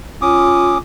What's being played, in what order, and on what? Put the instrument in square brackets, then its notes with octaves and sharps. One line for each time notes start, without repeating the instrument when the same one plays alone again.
[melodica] C#4 D6 D#6 [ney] F4